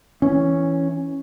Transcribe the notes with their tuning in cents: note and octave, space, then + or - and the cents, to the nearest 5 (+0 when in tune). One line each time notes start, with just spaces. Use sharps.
E3 +0 C#4 +0